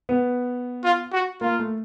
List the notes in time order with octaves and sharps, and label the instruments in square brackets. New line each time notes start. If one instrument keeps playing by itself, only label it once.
[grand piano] B3
[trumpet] F4
F#4
[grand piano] A#3 [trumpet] F4
[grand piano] A3